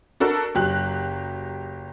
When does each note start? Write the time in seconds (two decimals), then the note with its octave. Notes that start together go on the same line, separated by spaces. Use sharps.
0.20 D4 F#4 A4 A#4
0.55 F#1 F#3 G4 F#6